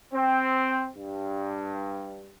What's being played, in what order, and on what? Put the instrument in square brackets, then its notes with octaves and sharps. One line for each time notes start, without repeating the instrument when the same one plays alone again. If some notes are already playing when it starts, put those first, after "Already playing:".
[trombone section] C4
G2